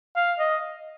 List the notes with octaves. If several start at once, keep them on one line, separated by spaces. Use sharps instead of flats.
F5
D#5